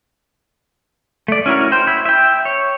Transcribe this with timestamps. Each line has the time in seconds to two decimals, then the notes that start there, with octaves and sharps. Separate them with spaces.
1.28 A3 D5
1.46 C#4 E4 F#4 A#4
1.72 C5 G5
1.87 E4
2.05 E5 G5
2.45 C#5